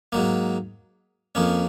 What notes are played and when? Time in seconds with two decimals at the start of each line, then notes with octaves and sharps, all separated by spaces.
0.12 G#2 F#3 A#3
1.35 F2 F3 A#3 C#4